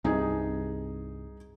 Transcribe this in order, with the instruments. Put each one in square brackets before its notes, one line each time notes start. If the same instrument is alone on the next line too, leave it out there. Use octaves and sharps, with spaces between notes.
[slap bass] C2 G2 C3 [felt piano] D#4 G#4